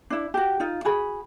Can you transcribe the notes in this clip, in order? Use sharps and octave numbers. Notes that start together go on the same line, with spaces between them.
D4 E4
F#4 G4
D#4 F4
F#4 G#4 B5